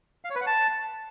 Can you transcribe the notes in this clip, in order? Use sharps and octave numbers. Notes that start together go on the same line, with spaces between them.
F5
C#5
B4
F#5
A5